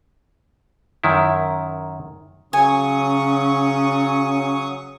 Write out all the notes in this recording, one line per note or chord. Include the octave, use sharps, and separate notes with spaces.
F#2 D#3 E4
C#3 F#3 C#4 G#5 C#6 D#6